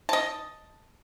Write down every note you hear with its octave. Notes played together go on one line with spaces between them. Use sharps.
D#5 A5